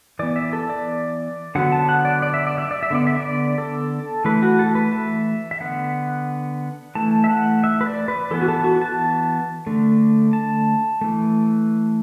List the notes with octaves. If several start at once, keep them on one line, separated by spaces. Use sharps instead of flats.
E3 B3 D5
E5
A4
D5
D3 F#3 B3 F#5
A5
F#5
D5
D5
E5
D5
E5
D5
E5
D3 B3 D5
E5
D5
A4
E3 A3 B4
F#4
A4
B4
E5
E5
D3 B3 F#5
E3 A3 A5
E5
F#5
E5
B4
D5
B4
E3 B3 A4
F#4
A4
F#4
A5
D3 A3
A5
E3 A3